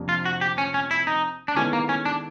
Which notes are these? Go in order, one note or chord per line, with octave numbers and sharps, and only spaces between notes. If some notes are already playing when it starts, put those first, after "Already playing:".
Already playing: F2 C3 F3 A#3 D4
F4
F#4
G4
C#4
C#4
E4
D#4
D4
D#3 G#3 B3 C#4 E4 A4
A#3
C#4
D4